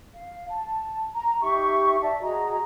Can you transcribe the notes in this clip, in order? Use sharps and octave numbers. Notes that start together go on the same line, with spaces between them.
F5
A5
A#5
D#4 G4 E5 C#6
D5 E5 A5
F#4 G#4 D#5 A#5